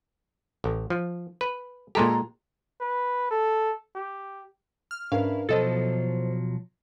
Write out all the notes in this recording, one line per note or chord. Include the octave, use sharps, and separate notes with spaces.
A1
F3
B4
A#2 G#3 G4 A4 A#5 C6
B4
A4
G4
F6
G#2 C#4 D4 E4 A#4 B4 F5
B2 F3 F#3 E4 A4 C5 D#5